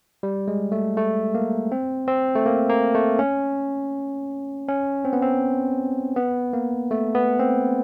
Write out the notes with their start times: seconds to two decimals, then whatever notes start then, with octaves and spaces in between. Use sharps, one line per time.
0.23 G3
0.48 G#3
0.72 A3
0.97 A3
1.35 A#3
1.72 C4
2.08 C4
2.35 A3
2.46 A#3
2.70 A#3
2.94 A3
3.19 C#4
4.68 C#4
5.05 C4
5.13 B3
5.22 C4
6.16 B3
6.53 A#3
6.91 A3
7.15 B3
7.40 C4